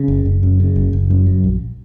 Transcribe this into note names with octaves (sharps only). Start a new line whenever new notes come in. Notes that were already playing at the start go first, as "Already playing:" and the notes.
Already playing: C#3
F#1
F#1
F#2
C#3
F#1
F#1
F#2
F#3
A#1